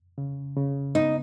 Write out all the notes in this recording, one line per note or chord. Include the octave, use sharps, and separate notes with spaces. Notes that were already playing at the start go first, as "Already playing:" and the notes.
C#3
C#3
B3 D#4